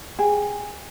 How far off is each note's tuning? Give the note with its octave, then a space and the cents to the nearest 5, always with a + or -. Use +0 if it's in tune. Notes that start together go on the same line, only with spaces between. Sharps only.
G#4 -10 G5 +0